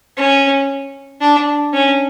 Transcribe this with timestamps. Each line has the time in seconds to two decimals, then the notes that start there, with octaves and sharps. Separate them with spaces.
0.17 C#4
1.21 D4
1.73 C#4